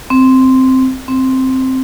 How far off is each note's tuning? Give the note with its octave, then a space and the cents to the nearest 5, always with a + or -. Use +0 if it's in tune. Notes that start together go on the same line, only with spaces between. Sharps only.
C4 -5
C4 +0